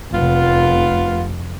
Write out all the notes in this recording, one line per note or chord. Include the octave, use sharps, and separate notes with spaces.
F1 B3 F4